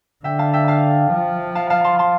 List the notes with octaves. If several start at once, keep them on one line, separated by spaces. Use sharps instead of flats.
D3 E5 G5
F5 A5
E5 G5
F5 A5
F3
F5 A5
F5 A5
A5 C6
A5 C6